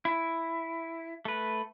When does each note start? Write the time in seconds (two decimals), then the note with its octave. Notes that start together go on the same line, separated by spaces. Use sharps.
0.05 E4
1.25 A3 B4